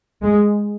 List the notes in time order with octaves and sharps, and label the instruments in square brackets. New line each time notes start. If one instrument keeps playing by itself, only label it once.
[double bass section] G#3